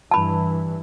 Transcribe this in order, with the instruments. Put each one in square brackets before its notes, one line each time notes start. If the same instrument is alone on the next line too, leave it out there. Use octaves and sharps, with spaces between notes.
[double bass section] G2 E3 [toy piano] A5 B5